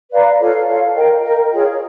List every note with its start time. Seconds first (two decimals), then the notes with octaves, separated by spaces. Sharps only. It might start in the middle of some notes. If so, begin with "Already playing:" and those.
0.12 B4 D5 F5 A#5
0.40 F4 A4 C#5 F5
0.68 F4 A4 C#5 F5
0.96 A#4 D#5 G5
1.24 A#4 D#5 G5
1.51 F4 G#4 C#5